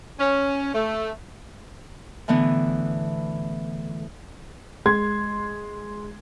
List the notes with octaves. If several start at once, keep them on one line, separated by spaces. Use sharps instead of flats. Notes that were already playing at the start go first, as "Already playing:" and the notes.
C#4
A3
A2 D3 E3 B3
G#3 C6 G#6